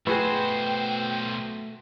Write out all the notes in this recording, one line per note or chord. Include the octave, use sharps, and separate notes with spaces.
B1 A3 F#4 G#4 B4 C5 G5